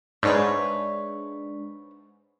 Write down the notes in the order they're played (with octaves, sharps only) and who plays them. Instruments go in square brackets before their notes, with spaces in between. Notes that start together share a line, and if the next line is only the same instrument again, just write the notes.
[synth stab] G#2 [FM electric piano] G#3 D4 [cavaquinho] B4 C#5 E5